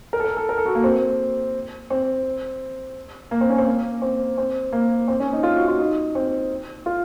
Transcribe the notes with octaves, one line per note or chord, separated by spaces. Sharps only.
A#4
A4
A#4
A4
A#4
A4
F#4
A#3
C4
C4
A#3
C4
C#4
C4
A#3
C4
C4
A#3
C4
C#4
D#4
F4
F#4
F4
D#4
C4
F4